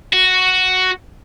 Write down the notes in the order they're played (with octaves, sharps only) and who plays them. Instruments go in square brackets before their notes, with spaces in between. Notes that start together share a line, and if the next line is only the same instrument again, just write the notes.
[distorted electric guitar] F#4